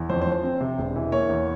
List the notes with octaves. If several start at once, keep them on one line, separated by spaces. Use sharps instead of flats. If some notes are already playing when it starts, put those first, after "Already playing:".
Already playing: E2
F2 C5
C5
F3
C5
C4
C3
E1
E3
A#3 C#5
E2